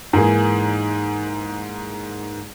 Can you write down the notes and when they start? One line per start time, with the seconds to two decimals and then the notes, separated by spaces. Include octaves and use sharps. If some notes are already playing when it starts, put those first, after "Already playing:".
0.13 G#2 E3 A#3 G#4